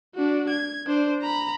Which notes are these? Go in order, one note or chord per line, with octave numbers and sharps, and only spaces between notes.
D4 F#4
G#6
D4 C5
A#5 B5